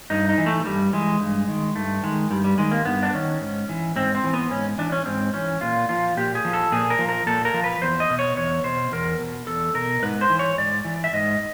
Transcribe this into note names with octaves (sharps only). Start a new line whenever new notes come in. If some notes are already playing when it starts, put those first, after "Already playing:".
G2 D#4
D#4
E3
A3
G2 G3
E3 G#3
G2
D#3
G2 A3
D#3 G#3
G2 G3
G3
D#3 G#3
A#3
G2 B3
D4
D#3 C#4
G#2
E3
G#2 C4
C4
E3
B3
G#2 C#4
E3 D4
C#4
G#2 C4
E3 C#4
A#2 F4
F3 F4
A#2 G4
G#4
F3
A4
A#2 G#4
A#4
F3
A#4
A#2 A4
A#4
F3
B4
E2 C5
D#5
B2
C#5
E2 C#5
B2 C5
E2 A#4
B2
E2 A4
B2 A#4
G#2 B4
C5
E3
C#5
G#2 D5
E3
E5
G#2 D#5